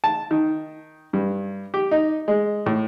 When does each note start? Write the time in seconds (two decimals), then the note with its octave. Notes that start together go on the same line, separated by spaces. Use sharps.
0.04 A5
0.31 D#3
1.13 G2
1.74 G4
1.91 D#4
2.28 G#3
2.66 A2